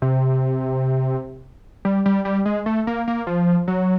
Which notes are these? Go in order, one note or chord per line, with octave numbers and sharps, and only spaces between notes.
C3
G3
G3
G3
G#3
A3
A#3
A#3
F3
F#3